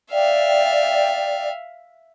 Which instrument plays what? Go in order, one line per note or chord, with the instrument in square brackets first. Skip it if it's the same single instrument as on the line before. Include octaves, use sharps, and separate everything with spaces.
[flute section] D5 G5 [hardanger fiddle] E5 F5